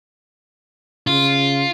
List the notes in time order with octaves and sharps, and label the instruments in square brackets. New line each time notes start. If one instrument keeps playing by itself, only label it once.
[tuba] C#3 [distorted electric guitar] F4